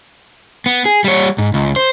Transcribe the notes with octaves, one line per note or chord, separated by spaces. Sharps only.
B3
G#4
G3 C#5
G#2
C#2
C5